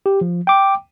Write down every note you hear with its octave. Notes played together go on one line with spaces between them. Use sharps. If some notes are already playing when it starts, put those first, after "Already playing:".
G4
F3
G5 D6